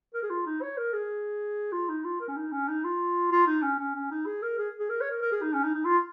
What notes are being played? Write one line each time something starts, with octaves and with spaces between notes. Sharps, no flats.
A#4
G#4
F4
D#4
C#5
A#4
G#4
F4
D#4
F4
A#4
C#4
D#4
C#4
D#4
F4
F4
D#4
C#4
C#4
C#4
D#4
G#4
A#4
G#4
G#4
A#4
C#5
A#4
A#4
G#4
D#4
C#4
D#4
D#4
F4